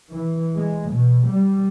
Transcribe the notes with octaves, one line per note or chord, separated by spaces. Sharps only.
E3
G#3
B2
G3